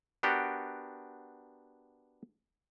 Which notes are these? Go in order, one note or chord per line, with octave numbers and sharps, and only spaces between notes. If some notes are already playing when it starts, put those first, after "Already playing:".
B3 D4 F#4 G4 A#4 F#5